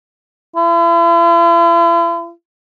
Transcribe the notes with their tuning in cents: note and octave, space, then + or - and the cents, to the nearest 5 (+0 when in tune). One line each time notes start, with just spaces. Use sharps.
E4 +45